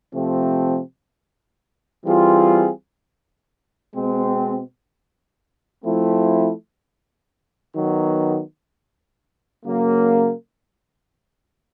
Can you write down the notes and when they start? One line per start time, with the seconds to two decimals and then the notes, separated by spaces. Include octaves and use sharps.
0.14 C3 F3 A3 C4
2.04 E3 G3 C4 F4 G#4
3.94 B2 G#3 C4
5.85 F3 A3 C4 E4
7.75 D#3 F#3 B3
9.65 C#3 F#3 A#3